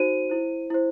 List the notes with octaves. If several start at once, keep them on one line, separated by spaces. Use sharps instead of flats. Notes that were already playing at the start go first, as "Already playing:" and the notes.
Already playing: D#4 F#4 C5 D#7
E4 C5
E4 C5